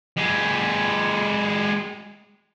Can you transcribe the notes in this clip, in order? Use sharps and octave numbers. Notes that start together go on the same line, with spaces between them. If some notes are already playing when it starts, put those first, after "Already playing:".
G#3 G4